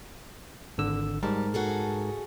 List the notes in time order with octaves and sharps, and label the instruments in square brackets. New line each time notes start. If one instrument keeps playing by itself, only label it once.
[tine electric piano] G#1 D3 E6
[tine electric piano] G#2 A#4 A5 [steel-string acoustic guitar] G3
[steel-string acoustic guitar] F#4 G#4 A4